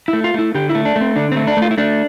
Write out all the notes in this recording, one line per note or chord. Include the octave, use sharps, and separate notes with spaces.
E4
A3
F4
A3 E4
D3 G4
E4
A3
D4
A3
C4
D3 D4
A3 C4
D4
A3
F4
E4
A3 D4